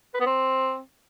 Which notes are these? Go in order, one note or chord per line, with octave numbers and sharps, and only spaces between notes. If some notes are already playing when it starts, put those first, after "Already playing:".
B4
B3
C4